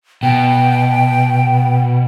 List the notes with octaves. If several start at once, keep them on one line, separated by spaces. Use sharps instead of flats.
B2 G5